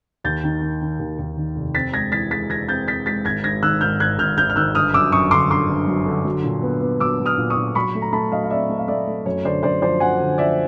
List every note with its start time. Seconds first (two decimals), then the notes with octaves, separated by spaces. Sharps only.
0.24 D#2 G6 A6
0.44 D#3
0.62 D#3
0.82 D#3
1.00 D#2
1.19 D#2
1.37 D#3
1.56 F1
1.75 C4 A6 B6
1.93 G#3 G#6 A#6
2.12 E3 A6 B6
2.31 G#3 A6 B6
2.50 E3 G#6 A#6
2.68 C4 G6 A6
2.87 C4 A6 B6
3.06 G#3 A6 B6
3.25 G#1 G#6 A#6
3.44 G#1 G#6 A#6
3.62 D#3 E6 F#6
3.81 G#2 F6 G6
4.00 G#1 F#6 G#6
4.18 G#1 F6 G6
4.38 G#1 F6 G6
4.50 F6
4.56 D#3 E6 F#6
4.75 G1 D#6 F6
4.94 F#2 D6 E6
5.12 F#2 C#6 D#6
5.31 D3 C6 D6
5.50 G1 C6 D6
5.70 G1
5.87 F#3
6.06 D3
6.25 F#3
6.44 A#2
6.63 B3
6.81 B3
7.00 F#3 D6 E6
7.19 F#3
7.26 D#6 F6
7.38 A#2
7.50 C#6 D#6
7.56 A#2
7.75 F#3 B5 C#6
7.95 A3
8.02 A#5
8.13 A3 A5 B5
8.32 F#3 D#5 F5
8.44 F5
8.50 C4 D5 E5
8.70 A3
8.78 F5
8.88 A3 D5 E5
9.07 A3
9.25 F#2 C#5
9.44 D3 C5 D5
9.63 F#2 C5 D5
9.82 F3 C5 D5
10.00 F#2 F#5 G#5
10.20 D3
10.38 F3 D5 E5